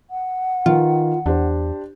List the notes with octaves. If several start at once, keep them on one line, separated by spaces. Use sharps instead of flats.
F#5
D#3 F4 B4
E2 D4 G4 C5